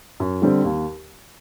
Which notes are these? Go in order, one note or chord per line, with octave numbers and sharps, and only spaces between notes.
F#2
D3 G3 C4
D#2